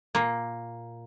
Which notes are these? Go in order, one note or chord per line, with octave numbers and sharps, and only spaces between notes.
A#2 A#3